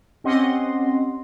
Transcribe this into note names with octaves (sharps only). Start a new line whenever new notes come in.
C4 C#4 G4 D#5 F#5 C6